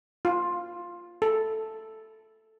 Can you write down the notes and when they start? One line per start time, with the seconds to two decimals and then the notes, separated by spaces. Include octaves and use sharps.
0.25 F4
1.22 A4